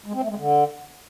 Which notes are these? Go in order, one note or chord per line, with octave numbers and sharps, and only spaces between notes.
G#3
C4
A3
G#3
D3